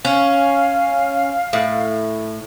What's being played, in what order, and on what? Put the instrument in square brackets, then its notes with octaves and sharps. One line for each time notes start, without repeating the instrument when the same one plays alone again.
[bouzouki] C#4 [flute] F5
[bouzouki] A2